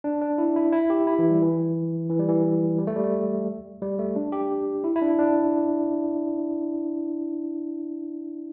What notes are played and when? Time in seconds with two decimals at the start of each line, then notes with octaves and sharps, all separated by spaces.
0.04 D4
0.22 D4
0.38 E4
0.56 E4
0.72 E4
0.90 G4
1.07 E4
1.19 E3
1.30 G3
1.42 E3
2.10 E3
2.19 G3
2.28 E3
2.79 G3
2.87 A3
2.96 G3
3.04 A3
3.82 G3
3.99 A3
4.16 D4
4.32 G4
4.84 E4
4.96 E4
5.02 D4
5.19 D4